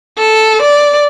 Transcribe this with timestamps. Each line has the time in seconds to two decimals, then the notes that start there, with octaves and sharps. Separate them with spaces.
0.18 A4
0.62 D5